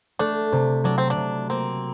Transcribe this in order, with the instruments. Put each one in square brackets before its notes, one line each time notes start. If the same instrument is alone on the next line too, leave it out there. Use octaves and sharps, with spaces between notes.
[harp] A3 [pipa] D4
[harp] C3
[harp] F#3 [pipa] D4
[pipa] C4
D4
[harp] C3
[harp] A#3 [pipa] C4